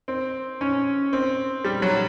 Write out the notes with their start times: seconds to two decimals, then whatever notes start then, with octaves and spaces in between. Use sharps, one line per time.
0.08 C4
0.61 C#4
1.13 C4
1.65 G3
1.82 F#3